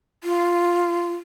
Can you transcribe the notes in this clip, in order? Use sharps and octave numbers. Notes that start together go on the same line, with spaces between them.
F4